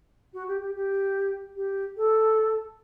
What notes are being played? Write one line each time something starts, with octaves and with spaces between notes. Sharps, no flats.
F#4
G4
G4
G4
G4
A4